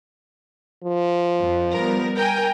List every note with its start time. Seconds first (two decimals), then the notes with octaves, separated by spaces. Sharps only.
0.84 F3
1.38 F2
1.72 G3 B3 A#4
2.16 A#4 G5 G#5